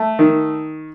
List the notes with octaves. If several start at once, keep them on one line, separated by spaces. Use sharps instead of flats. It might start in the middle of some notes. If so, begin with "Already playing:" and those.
Already playing: A3
D#3